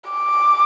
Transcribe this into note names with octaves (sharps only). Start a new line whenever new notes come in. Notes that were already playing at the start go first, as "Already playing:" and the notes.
D6